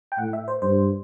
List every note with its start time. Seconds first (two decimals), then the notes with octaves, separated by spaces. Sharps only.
0.12 G5
0.18 A2 F#5
0.33 E5
0.48 C5
0.62 G2 C5